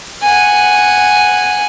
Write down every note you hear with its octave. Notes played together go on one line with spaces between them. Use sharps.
F#5 G#5